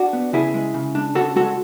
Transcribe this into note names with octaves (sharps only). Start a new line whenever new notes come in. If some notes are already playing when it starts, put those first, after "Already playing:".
Already playing: D4 F#4
B3
C#3 E4 G#4
G#3
C#3
D4
C#3 F#4 A4
G#3 F#4 A4